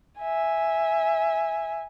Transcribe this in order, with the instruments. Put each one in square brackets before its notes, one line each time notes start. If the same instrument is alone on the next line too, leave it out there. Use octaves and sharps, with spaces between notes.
[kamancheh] E5 G#5